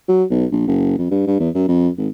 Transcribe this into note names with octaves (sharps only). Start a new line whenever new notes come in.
F#3
B1
A#1
F#1
F2
G2
G2
E2
F#2
F2
G#1